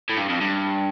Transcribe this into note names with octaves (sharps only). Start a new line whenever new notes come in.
A2
G2
F2
G2